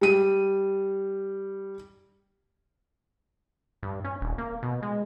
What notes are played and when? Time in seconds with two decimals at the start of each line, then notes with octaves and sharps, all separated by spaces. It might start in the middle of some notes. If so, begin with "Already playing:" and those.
0.01 G3 D#7
3.83 G2
4.04 C#4
4.21 D#1
4.38 A#3
4.63 B2
4.82 G#3